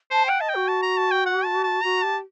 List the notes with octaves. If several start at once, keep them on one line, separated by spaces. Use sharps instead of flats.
C5 A5
F#5 G5
D#5 A5
G5
F#4
A5
A#5
A5
G5
F#5
A5
A5
F#4 A#5
G4 A5